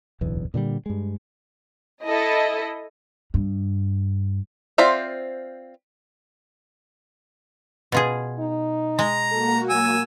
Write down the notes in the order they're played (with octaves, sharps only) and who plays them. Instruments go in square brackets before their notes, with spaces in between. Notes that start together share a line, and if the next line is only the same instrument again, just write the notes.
[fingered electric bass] D1 B1 E2 E3
A#2 D3 D#3 G3
G2 G#3
[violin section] E4 A4 D#5
[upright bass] G2
[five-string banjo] C4 F4 C5 D5 E5
[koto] B2 F4 G#4
[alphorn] D#4
[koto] G#3 [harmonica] A#5
[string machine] A#3 F#4 [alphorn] A4
[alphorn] F#3 [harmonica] G#5 E6